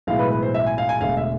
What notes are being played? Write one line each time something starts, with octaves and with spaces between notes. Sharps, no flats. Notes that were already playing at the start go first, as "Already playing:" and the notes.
B1 A2 E3 G#3 F5
B4
B4
C5
E5
G#5
F5
G#5
E1 D2 D3 G#3 F5
E5